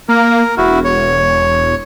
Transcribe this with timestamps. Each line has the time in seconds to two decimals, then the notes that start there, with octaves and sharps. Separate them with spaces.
0.09 A#3 A#4
0.58 E1 E4 F#4
0.85 C#5